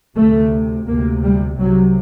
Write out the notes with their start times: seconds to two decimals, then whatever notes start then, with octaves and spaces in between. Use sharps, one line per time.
0.15 D2 C3 A3
0.87 D2 C3 A#3
1.22 G3
1.58 C2 C3 F#3